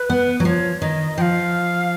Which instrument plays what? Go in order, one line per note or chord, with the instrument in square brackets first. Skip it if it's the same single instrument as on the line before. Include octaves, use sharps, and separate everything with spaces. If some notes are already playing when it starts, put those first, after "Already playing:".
Already playing: [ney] B4
[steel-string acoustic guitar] B3
F#3
[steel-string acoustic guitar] F3 [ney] C#5
[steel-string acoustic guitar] D#3 [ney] D#5
[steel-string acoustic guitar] F3 [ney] F5 G5